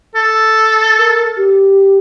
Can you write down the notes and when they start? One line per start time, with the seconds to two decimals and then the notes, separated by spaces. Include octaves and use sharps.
0.15 A4
0.99 A#4
1.37 G4